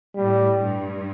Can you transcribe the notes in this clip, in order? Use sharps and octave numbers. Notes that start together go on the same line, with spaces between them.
A2 G3
G2